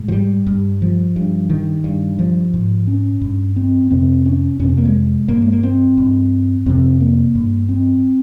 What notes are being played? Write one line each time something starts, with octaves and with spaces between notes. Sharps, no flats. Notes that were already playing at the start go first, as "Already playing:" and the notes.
Already playing: G#2
F3
G3
G2
F3
G2
D#3
G2
F3
G#2
C#4
G2
C4
F2 C3 C4
C#4
F2 C3 C4 C#4
A#3
G#3
G2 A#3
G#3
A#3
C4
G2
F2 C3 C4
A#3
G2
C4